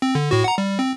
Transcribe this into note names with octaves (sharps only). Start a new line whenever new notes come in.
C4
D3
A2 F#4
F#5 A#5
G3
C4